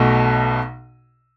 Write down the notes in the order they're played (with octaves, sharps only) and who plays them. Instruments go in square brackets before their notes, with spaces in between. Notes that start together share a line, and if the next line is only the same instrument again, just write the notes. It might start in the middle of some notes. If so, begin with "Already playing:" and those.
Already playing: [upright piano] B1 B2 A3